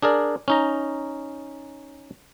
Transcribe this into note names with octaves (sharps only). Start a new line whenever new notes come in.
D4 G#4 A#4 D5
C#4 D#4 A#5